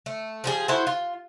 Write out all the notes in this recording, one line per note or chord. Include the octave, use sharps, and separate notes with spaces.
A3
F3 G3 G#4
E4 F#4 A4 C5
F4